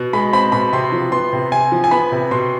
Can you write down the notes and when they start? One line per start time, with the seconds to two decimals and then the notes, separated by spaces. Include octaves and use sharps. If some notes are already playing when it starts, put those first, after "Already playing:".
Already playing: B2
0.13 G#3 B5
0.33 C4 B5
0.52 B2 B5
0.72 C3 C6
0.92 F3
1.12 B3 C6
1.33 C3
1.52 C3 G#5
1.72 F3
1.84 G#5
1.91 B3 B5
2.12 C3
2.31 B2 C6